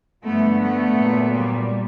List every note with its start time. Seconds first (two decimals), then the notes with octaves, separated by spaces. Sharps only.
0.23 G2 D3 F3 A3 B3
0.60 A3 B3
0.96 A#2 F#3
1.32 G3